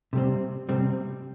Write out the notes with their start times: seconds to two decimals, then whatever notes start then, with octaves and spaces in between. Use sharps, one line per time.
0.13 C3 G3 C4
0.69 C3 G3 C4